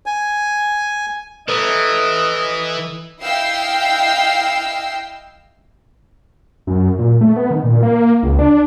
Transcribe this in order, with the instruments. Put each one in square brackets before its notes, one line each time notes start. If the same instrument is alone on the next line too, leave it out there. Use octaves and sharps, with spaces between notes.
[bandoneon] G#5
[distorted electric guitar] E3 [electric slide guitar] A4 B4 [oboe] D#5
[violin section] E4 D#5 F5 G5 E6 C7
[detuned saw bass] F#2
A#2
A3
B3
D#3
A#2
A#3
C#2
D4